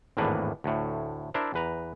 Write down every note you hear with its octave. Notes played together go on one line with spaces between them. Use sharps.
G#1 E2 A2 A#3 D4 B4
D2 A2
D4 E4 A#4 C5 E5
E2 B4 A#5